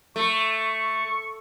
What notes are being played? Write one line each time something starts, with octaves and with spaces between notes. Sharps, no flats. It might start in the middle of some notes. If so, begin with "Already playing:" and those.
A3 C#6